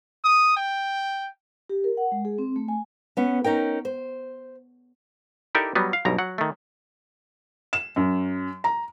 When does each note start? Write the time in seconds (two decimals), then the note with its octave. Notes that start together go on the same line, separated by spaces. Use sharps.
0.24 D#6
0.57 G5
1.69 G4
1.84 A#4
1.97 F#5
2.12 G#3
2.25 G#4
2.38 C4
2.56 A3
2.68 G#5
3.17 B3 C#4
3.44 C#4 D#4 A#4 G5
3.85 C5
5.55 D#4 E4 G4 A4 A#4 D5
5.75 F#3 G3 B3
5.93 F5
6.05 B1 G2 B2 A#5
6.19 F#3 F#5
6.38 D#3 A3
7.73 E7
7.96 F#2
8.64 A#5